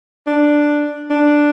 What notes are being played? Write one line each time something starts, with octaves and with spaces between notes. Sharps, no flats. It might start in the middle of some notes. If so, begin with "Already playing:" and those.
D4
D4